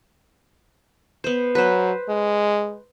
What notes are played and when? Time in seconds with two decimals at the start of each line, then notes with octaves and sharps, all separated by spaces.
1.24 B3 C5
1.55 F#3 B4 C5
2.09 G#3